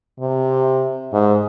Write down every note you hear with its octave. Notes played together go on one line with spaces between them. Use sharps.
C3
G#2